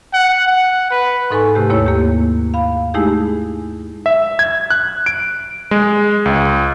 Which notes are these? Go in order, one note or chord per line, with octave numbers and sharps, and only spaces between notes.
F#5
F#5
B4
G#2 D#4 A4 B4 G#5 C#6
C3 A3 G4
D#2 A#3 E4 C#5
A#3 G4
F5 B5
G#3 A3 D#4 E4 G4 G#4
E5
G#6
F#6
D7
G#3
C#2